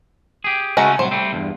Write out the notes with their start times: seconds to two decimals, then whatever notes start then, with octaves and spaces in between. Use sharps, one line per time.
0.44 G4 G#4
0.77 C#3 G#3 A3 C#4 F#4 A#5
0.99 C2 A2 F#3 C5
1.11 G3 A3 C4
1.33 E2 G2